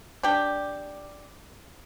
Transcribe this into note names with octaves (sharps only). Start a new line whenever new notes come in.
D4 G4